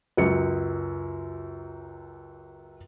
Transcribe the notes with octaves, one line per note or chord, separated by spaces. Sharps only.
C#2 F#2 C#7